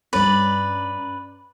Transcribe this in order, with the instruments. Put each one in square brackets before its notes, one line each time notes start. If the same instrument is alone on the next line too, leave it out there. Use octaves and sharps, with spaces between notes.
[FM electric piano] G2 C#4 A#5 [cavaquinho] B4 D5